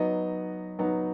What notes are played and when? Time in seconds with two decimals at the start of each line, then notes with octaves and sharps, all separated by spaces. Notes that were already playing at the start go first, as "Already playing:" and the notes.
Already playing: F#3 B3 D#4 D#5
0.79 F#3 B3 D#4